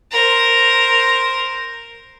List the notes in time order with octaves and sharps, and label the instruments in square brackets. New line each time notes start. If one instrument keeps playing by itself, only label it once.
[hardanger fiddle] A#4 C5